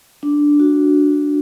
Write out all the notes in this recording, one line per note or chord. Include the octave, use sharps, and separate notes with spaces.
D4
F#4